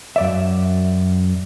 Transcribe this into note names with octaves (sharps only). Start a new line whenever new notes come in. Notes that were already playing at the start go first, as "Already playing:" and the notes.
F#2 D5 E5